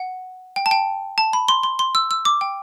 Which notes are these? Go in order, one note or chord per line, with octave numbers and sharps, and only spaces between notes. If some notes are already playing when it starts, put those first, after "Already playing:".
Already playing: F#5
G5
A5
G5
A5
B5
C6
C6
C6
E6
E6
D6
G5